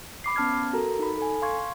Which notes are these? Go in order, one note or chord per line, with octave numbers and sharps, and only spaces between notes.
B5 D6 C7
B3 C#4 A5 F6 G#6
F#4 A4 A#4 A#5
D#4 B5
A4 G#5
F5 C6 C#6 G#6